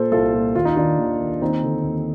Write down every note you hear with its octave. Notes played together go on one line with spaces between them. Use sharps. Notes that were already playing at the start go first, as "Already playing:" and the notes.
Already playing: A#2 A4 C5
C2 F4 A4
A#2
D#2 F4
D#4
D#3 D4 F4
D#2
D#3
D#2 C4 D#4
D3
D#2